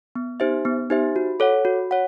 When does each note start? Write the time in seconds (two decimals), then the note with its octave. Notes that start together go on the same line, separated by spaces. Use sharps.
0.15 B3
0.40 D#4 G4 C5 E5
0.65 B3
0.90 D#4 G4 C5 E5
1.16 F#4
1.40 A4 C#5 F#5
1.65 F#4
1.91 C#5 F#5